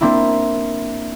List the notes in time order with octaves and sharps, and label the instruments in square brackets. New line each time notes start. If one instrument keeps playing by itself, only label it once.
[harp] A#3 C4 D4 E4